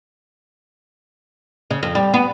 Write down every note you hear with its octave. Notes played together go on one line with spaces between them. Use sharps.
C#3
F2
G3
B3